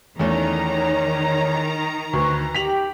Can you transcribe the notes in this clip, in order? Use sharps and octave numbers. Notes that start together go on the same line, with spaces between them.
E2 D#3 A3 C#4 A#5
C#5
D2 B4 C5 C#6
G4 G5 B6 F7 F#7